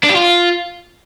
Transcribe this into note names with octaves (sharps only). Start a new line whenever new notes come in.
D4
G4
F4